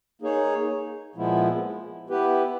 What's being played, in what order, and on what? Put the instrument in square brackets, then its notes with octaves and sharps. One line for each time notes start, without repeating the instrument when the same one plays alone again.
[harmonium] A#3 D#4 G#4 C#5
A#2 F3 G#3 B3 E4
B3 E4 G4 B4